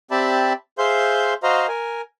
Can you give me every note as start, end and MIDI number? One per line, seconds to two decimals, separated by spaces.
0.11 0.53 60
0.11 0.53 67
0.11 0.53 74
0.11 0.53 76
0.11 0.53 81
0.11 0.53 83
0.78 1.34 68
0.78 1.34 72
0.78 1.34 76
0.78 1.34 77
0.78 1.34 84
0.78 1.34 91
1.43 1.67 66
1.43 1.67 72
1.43 1.67 75
1.43 1.67 77
1.43 1.67 82
1.68 2.01 70
1.68 2.01 80